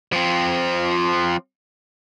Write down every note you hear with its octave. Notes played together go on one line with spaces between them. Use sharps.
F3 C4